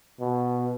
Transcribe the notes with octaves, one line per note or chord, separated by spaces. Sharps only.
B2